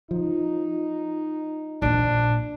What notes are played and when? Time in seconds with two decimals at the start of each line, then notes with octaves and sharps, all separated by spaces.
0.11 F3 D#4
1.82 A#1 A#2 D4